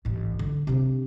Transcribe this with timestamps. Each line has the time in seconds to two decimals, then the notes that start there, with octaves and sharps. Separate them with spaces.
0.05 A1 G#2
0.39 D3
0.67 C3 D4